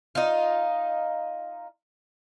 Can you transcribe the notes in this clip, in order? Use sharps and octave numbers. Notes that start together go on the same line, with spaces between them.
D#4 F4